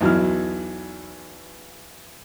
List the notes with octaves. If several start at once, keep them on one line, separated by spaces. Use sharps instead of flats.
B1 E2 F#3 E4 F6